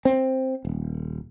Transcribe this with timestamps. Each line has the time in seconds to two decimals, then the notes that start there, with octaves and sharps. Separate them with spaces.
0.05 C4
0.65 D#1